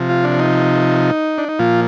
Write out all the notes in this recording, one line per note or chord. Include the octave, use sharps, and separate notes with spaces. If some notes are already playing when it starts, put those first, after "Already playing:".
Already playing: C3 F3
F4
D4
D#4
D4
D#4
A#2 F3 F4